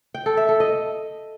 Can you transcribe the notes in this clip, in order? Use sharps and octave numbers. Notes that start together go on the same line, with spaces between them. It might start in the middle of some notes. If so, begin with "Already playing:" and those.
G5
A4
E5
A4
D#5